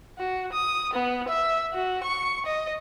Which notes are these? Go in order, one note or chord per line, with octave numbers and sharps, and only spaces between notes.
F#4
D#6
B3
E5
F#4
C#6
D#5